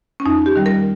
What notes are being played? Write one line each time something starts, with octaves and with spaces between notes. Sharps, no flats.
C#4
F2 D#4
G4
D#3 G3
A#4